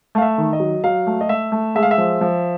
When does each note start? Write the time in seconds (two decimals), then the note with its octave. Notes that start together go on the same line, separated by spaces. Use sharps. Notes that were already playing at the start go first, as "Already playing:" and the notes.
0.15 A3 F5
0.22 E5
0.38 D#3
0.53 D#5
0.60 F#3
0.84 F#3 F5
1.07 A3
1.21 D#5
1.29 A3 E5
1.52 A3
1.75 G#3 E5
1.83 F5
1.91 E5
1.98 F3
2.21 F3